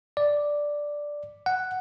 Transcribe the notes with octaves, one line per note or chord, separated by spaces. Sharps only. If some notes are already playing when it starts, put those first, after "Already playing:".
D5
F#5